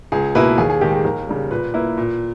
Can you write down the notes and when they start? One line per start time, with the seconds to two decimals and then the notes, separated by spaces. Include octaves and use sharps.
0.12 C#2 G#4
0.35 B2 A#3 E4 B4
0.58 D#2 G#4
0.70 G#4
0.81 D#3 G#3 G4
0.92 G#4
1.04 D#2 A#4
1.28 C#3 G3
1.51 A#2 B4
1.74 A#3 E4 B4
1.98 A#2